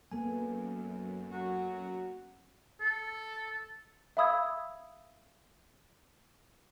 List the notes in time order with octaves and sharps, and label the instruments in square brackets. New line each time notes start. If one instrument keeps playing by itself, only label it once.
[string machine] F#2 [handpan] A#3 B3 [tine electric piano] A4 G#5
[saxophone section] F#3 F#4
[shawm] A4
[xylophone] E5 F5 B5 D#6 E6 G#6